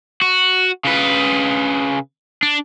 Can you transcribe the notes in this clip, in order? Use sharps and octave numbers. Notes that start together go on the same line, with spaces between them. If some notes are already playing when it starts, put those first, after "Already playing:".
F#4
C#3 B4
D4